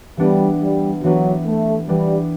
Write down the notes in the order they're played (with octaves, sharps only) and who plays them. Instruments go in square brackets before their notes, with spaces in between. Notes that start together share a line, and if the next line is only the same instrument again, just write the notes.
[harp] E3 B3 D4 G4 B4 [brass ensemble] G3
[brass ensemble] G3
[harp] E3 B3 D4 G4 B4 [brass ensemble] F#3
[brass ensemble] A3
[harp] E3 B3 D4 G4 B4 [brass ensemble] G3